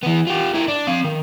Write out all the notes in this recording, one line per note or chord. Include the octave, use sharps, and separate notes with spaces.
E3 B3
F4 G4
E4 A#4
D4
C4 F5
D#3